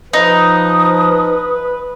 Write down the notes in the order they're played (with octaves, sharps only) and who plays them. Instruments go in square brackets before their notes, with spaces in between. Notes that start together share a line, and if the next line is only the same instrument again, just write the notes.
[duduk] F3 [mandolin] D#4 [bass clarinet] B4 [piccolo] D#6